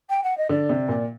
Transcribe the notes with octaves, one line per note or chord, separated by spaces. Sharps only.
G5
F#5
D#5
D3 D5
C3
A#2